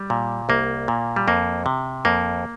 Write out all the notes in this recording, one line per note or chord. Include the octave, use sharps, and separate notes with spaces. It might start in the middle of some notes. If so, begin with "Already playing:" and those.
Already playing: G3
A#2
C2 A#3
A#2
G3
F2 A#3
C3
F2 A#3